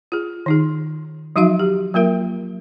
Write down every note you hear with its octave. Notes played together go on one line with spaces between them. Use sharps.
F4 G#4
D#3 D#4 G#4
F3 F#3 D#4 F#4 E5 F5
G4
F#3 A#3 F4 A#4 E5